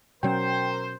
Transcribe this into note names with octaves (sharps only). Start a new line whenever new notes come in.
B2 F#3 C#4 A#4 C5 G5